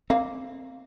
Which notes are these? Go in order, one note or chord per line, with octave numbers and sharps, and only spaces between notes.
A#3 C4 F5